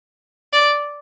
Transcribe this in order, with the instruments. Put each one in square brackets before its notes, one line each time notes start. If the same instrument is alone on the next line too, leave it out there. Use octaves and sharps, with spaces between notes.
[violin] D5